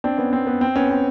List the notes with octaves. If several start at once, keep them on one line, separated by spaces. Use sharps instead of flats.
C4 D4
B3 C#4
C4
B3
C4
B3 C#4
C4